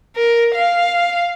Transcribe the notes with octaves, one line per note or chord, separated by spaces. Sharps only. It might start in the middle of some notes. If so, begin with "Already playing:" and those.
A#4
F5